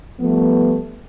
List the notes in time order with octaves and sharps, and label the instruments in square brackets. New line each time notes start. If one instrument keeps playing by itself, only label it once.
[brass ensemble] F3 G3 A3 B3